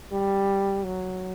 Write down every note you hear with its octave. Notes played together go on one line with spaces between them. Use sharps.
G3
F#3